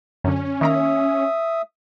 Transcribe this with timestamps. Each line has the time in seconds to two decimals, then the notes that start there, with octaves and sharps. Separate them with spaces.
0.24 F#2 D3 C#4
0.61 D#3 A#3 E5 A#5 D#6